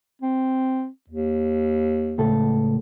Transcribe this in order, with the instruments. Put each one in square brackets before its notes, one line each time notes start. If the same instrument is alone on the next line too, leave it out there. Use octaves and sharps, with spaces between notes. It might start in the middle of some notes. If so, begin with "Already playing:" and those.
[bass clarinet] C4
D#2
[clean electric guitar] C#2 A2 A4